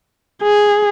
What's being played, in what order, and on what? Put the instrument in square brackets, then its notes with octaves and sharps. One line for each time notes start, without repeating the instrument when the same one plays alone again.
[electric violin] G#4